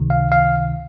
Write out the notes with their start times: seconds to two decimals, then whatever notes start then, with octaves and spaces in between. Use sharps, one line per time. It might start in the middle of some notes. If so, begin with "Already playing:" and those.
Already playing: C#2 C3 D#3
0.10 F5
0.32 F5